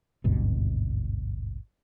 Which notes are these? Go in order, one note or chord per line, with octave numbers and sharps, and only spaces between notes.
G#1 D2 G2 B2